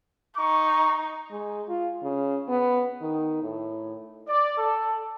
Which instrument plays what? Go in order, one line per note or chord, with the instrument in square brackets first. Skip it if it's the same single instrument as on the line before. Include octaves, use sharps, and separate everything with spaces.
[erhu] D#4 [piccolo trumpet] C#6
[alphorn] G#3
F4
C#3
B3
D#3
A2
[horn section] D5
A4